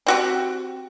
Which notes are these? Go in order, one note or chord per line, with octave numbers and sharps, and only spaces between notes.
C4 F#4 G4